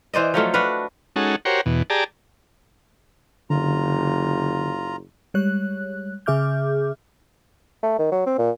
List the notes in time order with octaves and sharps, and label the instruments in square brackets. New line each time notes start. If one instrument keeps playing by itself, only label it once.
[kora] E3 C5 D5 D#5
F3 F#3 A3 F4
D4 F#4 B4 F5
[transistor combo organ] G#3 C#4 D#4 F#4 A4
F#4 G4 A#4 C5 C#5
E2 B2
G4 G#4 D5 A5 A#5
[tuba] F#1 [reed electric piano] D3 [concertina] F4 A#5
[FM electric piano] G3 G#3 C#5 F#6
C#3 G#4 E5 D6 F6 G6
[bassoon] A3
D#3
F#3
C4
A#2